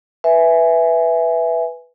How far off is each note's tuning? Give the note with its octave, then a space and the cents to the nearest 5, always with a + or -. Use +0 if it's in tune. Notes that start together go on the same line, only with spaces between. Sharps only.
B4 +0 E5 +0 G#5 +0